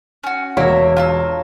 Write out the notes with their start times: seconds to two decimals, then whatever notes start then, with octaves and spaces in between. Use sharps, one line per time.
0.24 C#4 F#4
0.57 E1 A#3 E4 C#5 E5 A#5
0.97 F4 A5 E6